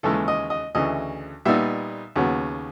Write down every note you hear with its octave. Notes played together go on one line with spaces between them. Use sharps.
D#2 C#3 E3 G#3 A4
D#5
D#5
D2 C#3 E3 D#5
A#2 G3 B3 D#4 E5
D#2 C#3 F#3 B3